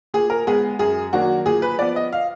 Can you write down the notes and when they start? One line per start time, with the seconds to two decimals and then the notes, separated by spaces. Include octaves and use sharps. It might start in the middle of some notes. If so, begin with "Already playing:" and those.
0.14 A#2 G#4
0.30 A#4
0.47 G#3 B3 G#4
0.79 F#2 G#4
1.13 D#3 F#3 A#3 D4 F#4
1.46 A#2 G#4
1.62 B4
1.78 F3 B3 D5
1.96 D#5
2.13 F5